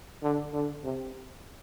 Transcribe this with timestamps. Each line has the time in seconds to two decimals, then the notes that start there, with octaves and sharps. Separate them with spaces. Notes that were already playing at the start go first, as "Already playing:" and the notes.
0.23 D3
0.53 D3
0.84 C3